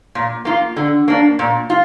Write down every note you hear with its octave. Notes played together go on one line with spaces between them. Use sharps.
A#2
A#3 F4
D3
A#3 D4
A#2
F4